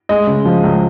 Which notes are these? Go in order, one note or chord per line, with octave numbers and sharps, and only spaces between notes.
G#3 D#5
C#3
F3
C#2